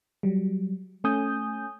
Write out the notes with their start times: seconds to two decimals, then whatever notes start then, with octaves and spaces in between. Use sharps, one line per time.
0.23 F#3 G3
1.04 A3 C#4 G#5 D#6 G6